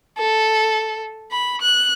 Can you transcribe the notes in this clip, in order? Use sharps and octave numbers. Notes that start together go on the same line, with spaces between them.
A4
B5
F#6